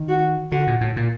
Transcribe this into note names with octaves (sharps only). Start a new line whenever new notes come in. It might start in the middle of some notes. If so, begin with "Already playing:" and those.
Already playing: D#3
F#4
D3 F#4
A#2
A2
A#2